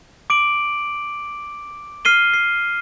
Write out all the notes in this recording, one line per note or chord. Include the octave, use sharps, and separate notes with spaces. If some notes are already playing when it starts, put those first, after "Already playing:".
D6 D7 F#7
F6 C7 D#7 G7
C7